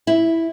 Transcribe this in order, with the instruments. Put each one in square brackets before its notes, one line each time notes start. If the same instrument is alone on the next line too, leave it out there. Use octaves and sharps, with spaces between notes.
[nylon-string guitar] E4